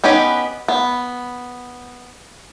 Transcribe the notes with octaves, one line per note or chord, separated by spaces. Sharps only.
B3 C#4 D#4 G4 B4
B3